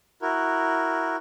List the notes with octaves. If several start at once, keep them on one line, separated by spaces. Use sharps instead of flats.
E4 F#4 A#4